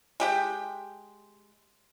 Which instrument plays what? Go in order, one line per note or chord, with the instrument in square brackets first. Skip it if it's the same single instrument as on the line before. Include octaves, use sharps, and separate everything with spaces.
[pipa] G#3 G4 G5